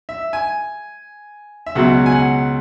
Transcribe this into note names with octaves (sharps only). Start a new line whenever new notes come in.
E5
G#5
E5
C#2 B2 F#3 F#5
G#5
F#5